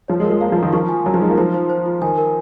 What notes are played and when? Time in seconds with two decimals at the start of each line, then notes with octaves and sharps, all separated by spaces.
0.08 F3 C#5
0.20 G#3
0.24 A#4
0.30 G#3
0.41 A#3 F5
0.52 F3
0.57 A#4
0.63 D#3
0.73 F3 C#6
0.89 G#5
1.05 F#3 A#4
1.14 F3
1.21 G#3 D#4
1.30 A#3
1.38 F3 C5
1.54 C5
1.70 C5
1.86 F4
2.02 D#3 G#5
2.18 A#4